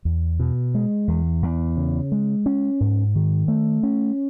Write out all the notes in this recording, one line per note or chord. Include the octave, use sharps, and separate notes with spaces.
E2
B2
G#3
E2
E2
C#3
G#3
C#4
G#2
D#3
A3
C#4